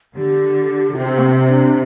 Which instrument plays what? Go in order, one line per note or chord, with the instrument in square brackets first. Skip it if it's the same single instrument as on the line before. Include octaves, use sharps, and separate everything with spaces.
[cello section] D3 [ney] G4
[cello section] C3 [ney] C4
[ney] A3
C4
D4